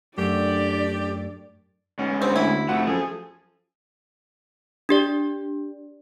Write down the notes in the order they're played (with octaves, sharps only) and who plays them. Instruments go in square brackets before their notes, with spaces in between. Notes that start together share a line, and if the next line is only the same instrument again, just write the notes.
[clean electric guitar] F#2 A3 [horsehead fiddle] D4 D5 [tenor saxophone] G4
[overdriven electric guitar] G#2 B3 [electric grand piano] C#4
[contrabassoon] G2 [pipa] C4
[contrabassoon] D2 [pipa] E4
[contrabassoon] F1 [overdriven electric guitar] F3 A3 [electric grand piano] F#4 F#5
[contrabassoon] F#2 [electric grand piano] F3 A4 [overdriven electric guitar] G#4
[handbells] D4 G4 D5